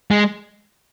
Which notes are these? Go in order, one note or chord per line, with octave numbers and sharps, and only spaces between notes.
G#3